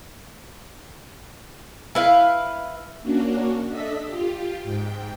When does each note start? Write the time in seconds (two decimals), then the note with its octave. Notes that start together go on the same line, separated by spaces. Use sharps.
1.95 E4 B4 F5
3.02 A#3 C#4 D4 F#4
3.69 D4 A4 D#5 E5 B6
4.05 F4 G4
4.63 G#2 G5